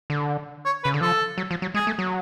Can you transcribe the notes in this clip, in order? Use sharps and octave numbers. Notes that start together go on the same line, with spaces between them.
D3
C#5
C#3 B4
D3
F3 A4
F#3
F3
F#3
G#3 G#4
A3
F#3